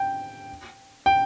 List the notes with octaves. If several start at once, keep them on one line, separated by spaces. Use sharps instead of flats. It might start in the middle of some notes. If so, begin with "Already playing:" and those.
Already playing: G5
G5